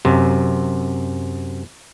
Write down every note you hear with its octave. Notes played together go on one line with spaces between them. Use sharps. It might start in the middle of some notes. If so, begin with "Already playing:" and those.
F#2 C3